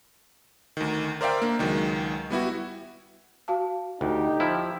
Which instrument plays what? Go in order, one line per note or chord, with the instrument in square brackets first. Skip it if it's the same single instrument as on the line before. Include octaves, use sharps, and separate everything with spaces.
[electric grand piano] D2 D#3
A#4 C5 D5 E5 F5 G5
A#3 D4
C#2 D#3 F#3 G#3
G3 B3 E4 F#4
[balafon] F#4 F5 A5
[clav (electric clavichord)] D2 [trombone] D#4 [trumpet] G4
[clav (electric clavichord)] F3 E4